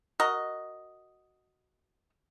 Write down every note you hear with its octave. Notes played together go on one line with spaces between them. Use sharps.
F#4 A#4 D#5